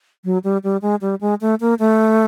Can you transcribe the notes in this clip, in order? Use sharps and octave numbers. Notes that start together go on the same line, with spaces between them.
F#3
G3
G3
G#3
G3
G#3
A3
A#3
A3